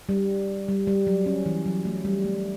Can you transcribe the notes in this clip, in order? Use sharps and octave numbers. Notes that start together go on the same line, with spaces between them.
G3
G3
G3
F#3
C#4
E3
F#3
A3
G3
A3